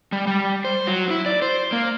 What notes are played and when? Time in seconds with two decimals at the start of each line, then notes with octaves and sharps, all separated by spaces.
0.12 G3
0.27 G3
0.65 C5
0.87 F#3
1.10 E4
1.26 D5
1.42 C5
1.72 A#3